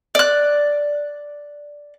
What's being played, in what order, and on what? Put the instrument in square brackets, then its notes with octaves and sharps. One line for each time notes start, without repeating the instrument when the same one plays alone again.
[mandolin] D5 F#6